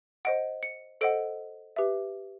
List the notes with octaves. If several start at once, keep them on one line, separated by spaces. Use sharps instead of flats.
C5 D#5 F#5 D7
C#7
A4 C5 D#5 F#5 D7
G4 B4 E5